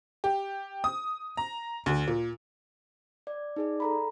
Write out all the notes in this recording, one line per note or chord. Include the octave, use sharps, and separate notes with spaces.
G4
D#6
A#5
D2
A#2
D5
D#4 G#4 D5
A4 A#5 B5